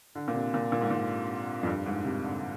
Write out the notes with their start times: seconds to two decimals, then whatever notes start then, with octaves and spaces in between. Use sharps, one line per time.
0.15 D3
0.28 A#2
0.35 C3
0.54 A#2
0.72 A#2
0.81 G#2
0.90 A#2
1.63 F2
1.67 G2
1.86 G#2
2.04 C3
2.24 D3